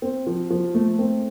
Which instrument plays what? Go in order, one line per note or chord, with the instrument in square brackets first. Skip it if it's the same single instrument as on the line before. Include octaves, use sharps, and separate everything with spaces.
[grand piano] C4
F3
F3
A3
C4